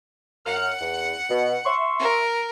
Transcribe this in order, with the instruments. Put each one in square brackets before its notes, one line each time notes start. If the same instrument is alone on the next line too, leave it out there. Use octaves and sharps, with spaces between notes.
[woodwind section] F#2 A#4 F6 [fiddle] F#5
[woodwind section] E2
B2
E5 C6 C#6
[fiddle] A#4